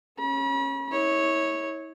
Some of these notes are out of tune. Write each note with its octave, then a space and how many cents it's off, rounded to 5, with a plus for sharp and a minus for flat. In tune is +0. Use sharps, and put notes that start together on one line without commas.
C#4 -20 B5 -40
E4 -35 C#5 -5